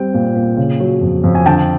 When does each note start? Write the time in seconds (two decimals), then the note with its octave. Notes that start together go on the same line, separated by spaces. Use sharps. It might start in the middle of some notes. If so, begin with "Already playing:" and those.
Already playing: G3 C4 G5
0.14 A#2
0.36 A#2
0.57 C#3
0.80 F#3
1.01 F2
1.24 F2
1.35 G#5
1.46 D3 G5 A5